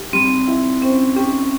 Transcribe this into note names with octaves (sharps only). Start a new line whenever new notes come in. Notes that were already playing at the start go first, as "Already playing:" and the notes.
Already playing: G4
G3 C4
E4
C4 C#4
C#4 G4